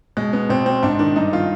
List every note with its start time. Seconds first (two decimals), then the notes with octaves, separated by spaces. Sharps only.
0.17 B2 G#3
0.33 B3
0.49 B2 C4
0.66 C4
0.83 G#2 D4
0.99 D#3 D4
1.16 G2 D#4
1.33 D#3 F4